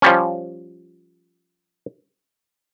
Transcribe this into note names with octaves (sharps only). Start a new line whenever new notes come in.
F3 G3 C#4